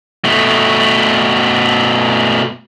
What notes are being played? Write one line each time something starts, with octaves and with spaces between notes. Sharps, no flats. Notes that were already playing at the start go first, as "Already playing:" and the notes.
B2 A3